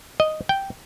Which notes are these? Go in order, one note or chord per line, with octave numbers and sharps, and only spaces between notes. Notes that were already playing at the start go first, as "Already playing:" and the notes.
D#5
G5